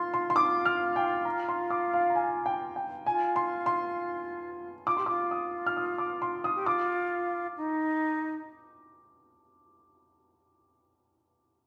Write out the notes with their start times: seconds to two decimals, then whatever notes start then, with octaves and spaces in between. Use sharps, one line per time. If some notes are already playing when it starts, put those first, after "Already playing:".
Already playing: F4 C6
0.14 C6
0.30 C6
0.36 D6
0.65 F6
0.96 G5
1.25 A#5
1.49 C6
1.70 D6
1.94 F5
2.10 A#5
2.15 G#5
2.46 G5
2.76 G5
3.06 F4 G#5
3.36 C6
3.66 C6
4.87 F4 D6
4.97 G4 C6
5.06 F4 D6
5.31 D#6
5.66 F6
5.77 D#6
5.98 D6
6.22 C6
6.44 D#6
6.55 G4
6.66 F4 D6
7.57 D#4